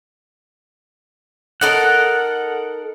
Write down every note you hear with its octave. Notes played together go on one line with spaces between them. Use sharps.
D#4 A4 A#4 F#5